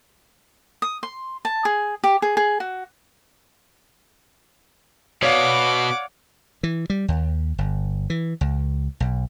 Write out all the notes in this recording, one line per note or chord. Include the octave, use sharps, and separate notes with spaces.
D#6
C6
A5
G#4
G4
G#4
G#4
F#4
B2 C#5 D5 F5 F#5 D6
E3
G3
D#2
G1
E3
C#2
B1